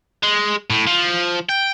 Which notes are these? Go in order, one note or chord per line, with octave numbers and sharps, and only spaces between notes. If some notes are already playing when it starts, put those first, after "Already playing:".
G#3
A2
F3
G5